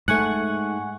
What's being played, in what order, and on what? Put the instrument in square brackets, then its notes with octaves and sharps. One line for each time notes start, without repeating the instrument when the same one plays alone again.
[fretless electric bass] G#2 A3 [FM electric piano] F#5 G#5 C#6